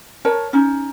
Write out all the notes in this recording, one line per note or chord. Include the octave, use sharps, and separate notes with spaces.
A#4 C#5 A5
C#4 D#4